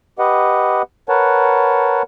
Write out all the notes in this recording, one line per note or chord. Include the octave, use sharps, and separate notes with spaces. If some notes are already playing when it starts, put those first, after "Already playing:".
G4 B4 D#5 F#5
A#4 B4 C#5 F#5 A5